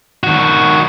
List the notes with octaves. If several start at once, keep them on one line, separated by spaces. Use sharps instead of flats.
D#3 F#4